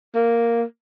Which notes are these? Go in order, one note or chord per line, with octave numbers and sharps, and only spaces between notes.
A#3